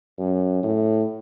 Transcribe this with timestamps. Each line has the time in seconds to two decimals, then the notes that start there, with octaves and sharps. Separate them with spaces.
0.19 F#2
0.63 A2